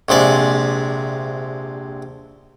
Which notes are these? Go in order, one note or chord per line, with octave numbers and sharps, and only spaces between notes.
A#1 C3 G#3 D5